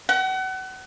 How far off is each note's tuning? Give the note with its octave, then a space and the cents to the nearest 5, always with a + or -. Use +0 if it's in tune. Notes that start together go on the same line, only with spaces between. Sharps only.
F#5 +35